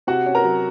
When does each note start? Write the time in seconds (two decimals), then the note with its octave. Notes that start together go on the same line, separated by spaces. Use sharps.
0.07 C3 F#4 F#5
0.26 C#4
0.35 A#4 A#5
0.44 F#3